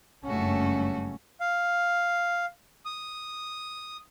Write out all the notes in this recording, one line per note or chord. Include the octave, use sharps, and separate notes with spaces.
F#1 G2 A3 C#4 F#4 A4
F5
D#6